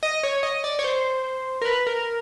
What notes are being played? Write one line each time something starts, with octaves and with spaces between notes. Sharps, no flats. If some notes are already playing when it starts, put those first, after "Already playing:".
D#5
C#5
D#5
D5
C#5
C5
A#4
B4
A#4